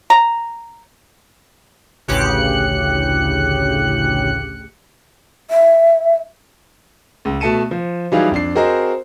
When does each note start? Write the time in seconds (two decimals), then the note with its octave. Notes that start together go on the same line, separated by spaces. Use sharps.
0.10 A#5
2.08 A1 D2 C#3 G4 F#6 C#7
5.50 E5
7.25 C#2
7.40 B2 A3 A5 C#7 D#7 E7
7.71 F3
8.12 E3 F#3 G3 D#4 F4 G#4
8.31 F2 D4 C7
8.55 C4 F#4 G#4 A#4 C5 D#5